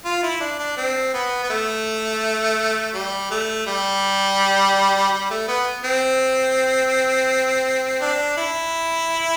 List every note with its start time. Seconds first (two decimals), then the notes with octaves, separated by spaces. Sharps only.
0.05 F4
0.23 E4
0.40 D4
0.59 D4
0.77 C4
1.14 B3
1.43 B3
1.50 A3
2.94 G3
3.31 A3
3.67 G3
5.12 G3
5.30 A3
5.48 B3
5.84 C4
8.01 D4
8.37 E4